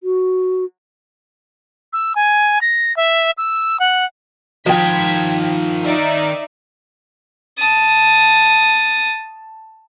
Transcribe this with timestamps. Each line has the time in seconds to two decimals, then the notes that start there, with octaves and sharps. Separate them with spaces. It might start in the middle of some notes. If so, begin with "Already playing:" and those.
0.03 F#4
1.93 E6
2.16 G#5
2.61 A#6
2.97 E5
3.38 E6
3.80 F#5
4.66 D#3 F3 C5 G5 G#6 B6
5.84 D#4 D5 E5
7.58 A5 D#6